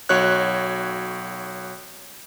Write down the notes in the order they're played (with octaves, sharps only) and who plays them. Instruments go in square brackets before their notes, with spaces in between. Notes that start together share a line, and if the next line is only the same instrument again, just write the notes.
[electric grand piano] B1 F#4 C#5 F#6